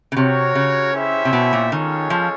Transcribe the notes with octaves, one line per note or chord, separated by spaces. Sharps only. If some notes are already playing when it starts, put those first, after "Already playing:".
C#3
C3 F#4 A#4 C#5
C#3
C#4 E4 G4 C5 E5
C3
B2
A#2
D#3 G#3 C#4 F4 A4 C#5
F3